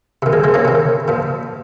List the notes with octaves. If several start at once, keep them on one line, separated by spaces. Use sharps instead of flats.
C3 D#3
F3 G#3
G#3 C4
A#3 C#4
C3 D#3
A#2 F3